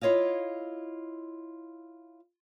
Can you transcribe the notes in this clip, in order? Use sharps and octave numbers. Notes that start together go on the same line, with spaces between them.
E4 F4 C#5 D#5 F5